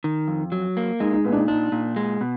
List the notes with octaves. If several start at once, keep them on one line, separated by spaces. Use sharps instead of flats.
D#3
F2
F#3
A#3
G#3 D#4
D#4
A#2 B3
D4
D#4
D4 D#4
A#2
G#3
B2